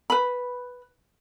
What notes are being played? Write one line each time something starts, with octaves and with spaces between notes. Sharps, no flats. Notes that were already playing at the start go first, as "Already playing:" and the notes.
B4 B5